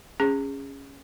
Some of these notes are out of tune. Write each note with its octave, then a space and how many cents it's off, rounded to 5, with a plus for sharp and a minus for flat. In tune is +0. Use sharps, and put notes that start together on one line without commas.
C#4 +0 G#4 -20